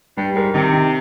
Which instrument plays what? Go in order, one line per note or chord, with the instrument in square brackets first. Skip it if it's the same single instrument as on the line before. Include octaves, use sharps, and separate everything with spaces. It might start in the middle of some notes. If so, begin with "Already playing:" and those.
[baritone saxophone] G2 [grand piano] G3
[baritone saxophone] G#2 [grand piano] A#4
[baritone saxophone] C3 [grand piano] D#3
[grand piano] D#4